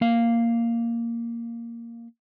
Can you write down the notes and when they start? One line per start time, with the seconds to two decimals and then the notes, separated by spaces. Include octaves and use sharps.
0.01 A#3 F5